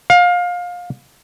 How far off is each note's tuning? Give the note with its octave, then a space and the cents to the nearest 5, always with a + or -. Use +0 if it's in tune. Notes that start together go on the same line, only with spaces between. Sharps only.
F5 +25